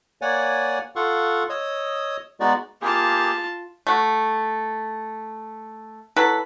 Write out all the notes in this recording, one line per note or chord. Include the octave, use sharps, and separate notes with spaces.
A#3 C#5 D5 F#5 G#5
F4 A4 F5 F#5 C#6
C#5 D#5 D#6 E6
G#3 B3 D#4 F#4 D5
A#3 F4 G4 G#4 A5
A3 F#4
F#3 E4 A4 B4